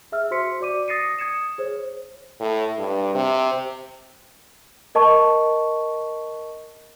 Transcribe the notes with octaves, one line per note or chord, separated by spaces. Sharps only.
G#4 E5 E6 F6
F#4 C5 C6 B6 C#7
F#4 D5 D6 D#7
D#6 A6 A#6 C7 C#7 D#7
D#6 G#6 C#7 E7
G#4 C5 C#5
A2
G2
C3
A#4 D#5 A5 C#6